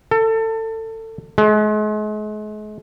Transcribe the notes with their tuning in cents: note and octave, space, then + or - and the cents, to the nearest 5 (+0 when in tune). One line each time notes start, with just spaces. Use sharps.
A4 +25
G#3 +40